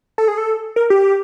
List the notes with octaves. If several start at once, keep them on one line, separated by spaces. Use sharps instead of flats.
A4
G#4
A4
A#4
G4